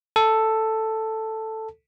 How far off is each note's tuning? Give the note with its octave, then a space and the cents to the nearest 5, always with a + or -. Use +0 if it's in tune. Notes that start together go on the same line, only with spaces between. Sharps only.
A4 +5